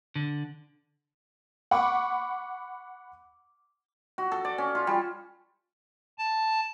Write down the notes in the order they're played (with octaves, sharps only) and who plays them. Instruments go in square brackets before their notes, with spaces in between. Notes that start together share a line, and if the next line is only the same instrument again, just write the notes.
[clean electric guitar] D3
[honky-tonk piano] F#5 B5 C#6 D6
[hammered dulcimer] F#4
A4
D5
C#4
F4
G3
[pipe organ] A5